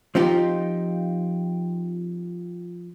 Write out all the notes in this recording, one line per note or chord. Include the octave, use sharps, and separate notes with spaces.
F3 C4 D#4 F4 G4